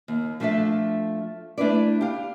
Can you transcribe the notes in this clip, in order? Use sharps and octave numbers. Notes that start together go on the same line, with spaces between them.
D#2
F3 A3 D4 A4 E5
A3 D4 E4 B4 D5
G4 F5